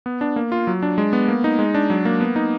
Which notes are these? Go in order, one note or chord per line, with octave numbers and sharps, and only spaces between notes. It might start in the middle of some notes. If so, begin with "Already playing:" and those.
B3
D4
A#3
F4
F#3
D4
G#3
B3
A#3
D#4
G#3
D4
F#3
A#3
B3
D#4